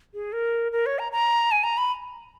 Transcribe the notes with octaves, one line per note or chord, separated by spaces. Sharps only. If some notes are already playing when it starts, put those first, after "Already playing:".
G#4
A#4
A#4
C#5
A#5
A#5
G#5
A#5
B5